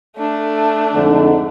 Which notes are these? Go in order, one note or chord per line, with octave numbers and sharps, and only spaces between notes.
A3 D4
F2 G#2 D3